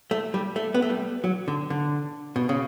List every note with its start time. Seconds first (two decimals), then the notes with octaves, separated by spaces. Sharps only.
0.11 A3
0.34 G3
0.56 A3
0.74 B3
0.82 A3
0.90 G3
1.24 F#3
1.48 D3
1.70 D3
2.36 B2
2.49 C#3